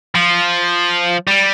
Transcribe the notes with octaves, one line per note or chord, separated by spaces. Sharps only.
F3
G3